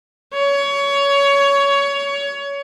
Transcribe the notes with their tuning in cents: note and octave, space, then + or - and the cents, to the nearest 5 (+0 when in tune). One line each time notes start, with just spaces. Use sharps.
C#5 +20